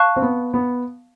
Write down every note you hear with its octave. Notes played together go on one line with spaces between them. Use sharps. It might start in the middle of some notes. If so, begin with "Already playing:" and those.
Already playing: F5 A5 C#6 F#6
C4
B3
B3